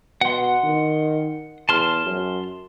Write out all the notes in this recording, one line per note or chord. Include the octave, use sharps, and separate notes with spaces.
B2 F#5 C6
D#3
E2 A5 C6 F6
F#2